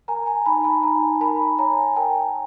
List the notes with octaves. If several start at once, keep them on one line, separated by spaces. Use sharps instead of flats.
A#4 G#5 A#5
G#5 A#5
D#4 A5 B5
A5 B5
D#4 G#5 A#5
A#4 A5 B5
C#5 G#5 A#5
A#4 G5 A5